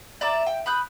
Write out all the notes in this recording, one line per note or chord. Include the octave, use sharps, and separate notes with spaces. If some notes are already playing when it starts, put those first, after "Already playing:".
D5 E5 A#5 D6
G5
B5 D#6 F#6 G6